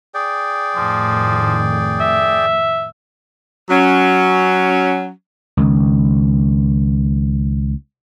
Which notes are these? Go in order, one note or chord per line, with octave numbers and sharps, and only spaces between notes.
G#4 D5 G5
F2 A2 D#3 F3
E5
F#3 C#4
C#2 D#3